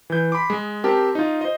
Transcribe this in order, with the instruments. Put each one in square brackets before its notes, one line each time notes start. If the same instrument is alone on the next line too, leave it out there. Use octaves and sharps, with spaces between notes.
[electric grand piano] E3 G6
B5 C6 D6
G#3
C4 G4 A#4 A5
D#4 F4
C5 D#5